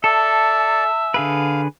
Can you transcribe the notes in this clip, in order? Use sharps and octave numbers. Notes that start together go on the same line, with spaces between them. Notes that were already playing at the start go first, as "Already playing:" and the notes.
A4 D5 E5 A5
D3 G#4 B4 F5